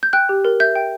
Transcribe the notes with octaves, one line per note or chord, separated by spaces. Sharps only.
G6
G5 F#6
G4
A#4
E5 G6
G5